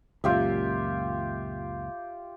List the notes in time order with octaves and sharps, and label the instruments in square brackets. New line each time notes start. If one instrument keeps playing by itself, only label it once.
[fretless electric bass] C#2 F#2 A#2 [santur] F4 G4 E5